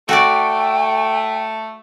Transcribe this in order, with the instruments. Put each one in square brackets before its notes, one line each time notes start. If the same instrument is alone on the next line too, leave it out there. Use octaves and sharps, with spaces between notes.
[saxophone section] A3 [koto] F#4 D5 [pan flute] G5